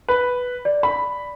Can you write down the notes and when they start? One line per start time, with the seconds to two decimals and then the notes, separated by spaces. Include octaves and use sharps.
0.09 B4
0.65 D5
0.83 B5